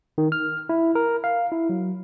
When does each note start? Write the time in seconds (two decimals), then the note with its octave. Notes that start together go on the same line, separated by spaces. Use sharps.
0.18 D#3
0.32 F6
0.69 E4
0.95 A#4
1.24 F5
1.52 E4
1.69 F#3